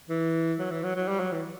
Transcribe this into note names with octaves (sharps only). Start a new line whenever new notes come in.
E3
F#3
E3
F#3
F#3
G3
F#3
E3